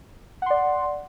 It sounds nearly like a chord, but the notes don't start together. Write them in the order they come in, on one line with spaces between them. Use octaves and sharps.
F#5 C6 D5